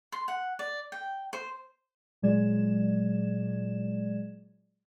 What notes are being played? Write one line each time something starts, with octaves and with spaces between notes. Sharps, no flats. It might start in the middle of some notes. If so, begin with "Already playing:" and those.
C6
F#5
D5
G5
C5
A#2 F#3 G#3 D5 G#6 E7